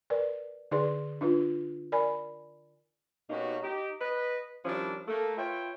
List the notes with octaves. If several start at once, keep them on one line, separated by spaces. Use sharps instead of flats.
A#4 B4 D5
D3 D#4 G#4 B4 D5 C6
D4 D#4 F4 B4
A#4 D5 G#5 B5
B2 A#3 C#4 D#4 F#4 G4
D#4 G4
B4 D#5
D#3 F3 G3 C#4 D4 E4
A3 A#3
F4 B4 C#5 E5 G5